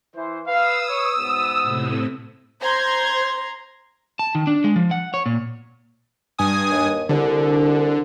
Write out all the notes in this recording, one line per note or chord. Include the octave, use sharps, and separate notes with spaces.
E3 C5
B4 F5 D#6 E6
B4 C#5
G#2 B2 B3
A2 C3
C5 A#5 C6 G#6
A5
D#3
D4
G#3
F3
F#5
C#5
A#2
G2 G#5 D#6
D#2
C2 D3